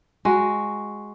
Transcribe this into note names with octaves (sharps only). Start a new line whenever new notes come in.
G#3 F#4